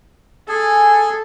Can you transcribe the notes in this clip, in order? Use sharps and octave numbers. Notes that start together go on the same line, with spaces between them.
G#4 A4 G#5